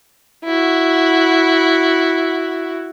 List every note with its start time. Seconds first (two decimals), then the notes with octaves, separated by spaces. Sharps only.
0.45 E4 F#4